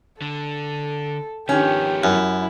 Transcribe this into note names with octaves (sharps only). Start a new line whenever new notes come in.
D3 A4
D#3 F3 B3 C#4 G4
F#2 E4